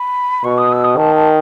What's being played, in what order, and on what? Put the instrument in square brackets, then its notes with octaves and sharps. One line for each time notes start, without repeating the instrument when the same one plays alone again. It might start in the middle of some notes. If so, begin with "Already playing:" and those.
Already playing: [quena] B5
[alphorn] B2 [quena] C#6
[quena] D#6
E6
D#6
[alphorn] D#3 [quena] A5
[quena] A5